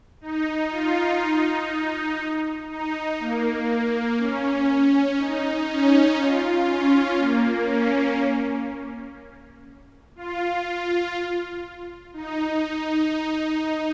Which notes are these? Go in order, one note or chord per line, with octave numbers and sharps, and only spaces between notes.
D#4
F4
D#4
D#4
A#3
C#4
D#4
C#4
F4
C#4
A#3
C#4
F4
D#4